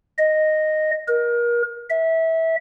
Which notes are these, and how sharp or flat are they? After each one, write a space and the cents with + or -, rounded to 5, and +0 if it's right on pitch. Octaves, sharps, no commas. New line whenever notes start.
D#5 -5
A#4 +30
E5 -20